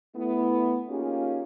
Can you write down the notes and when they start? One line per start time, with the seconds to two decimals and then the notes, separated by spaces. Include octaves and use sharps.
0.15 A3 B3 E4
0.89 A#3 C#4 D#4 F4 G4 G#4